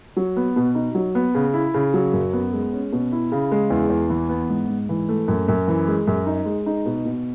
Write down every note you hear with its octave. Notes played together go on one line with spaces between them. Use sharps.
F#3
B3
B2
D#4
F#3
B3
C#3
E4
C#3
F#3
F#2
B3
G#3
C#4
B2
E4
C#3
G#3
E2
E2
E3
B3
G#2
G#2
E3
A3
F#2
F#2
E3
G#3
F#2
D#4
G#3
D#4
B2
B2